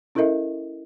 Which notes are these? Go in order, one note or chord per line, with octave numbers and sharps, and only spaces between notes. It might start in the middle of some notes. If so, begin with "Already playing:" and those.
C#4 E4 A4 A#4 D#5 E5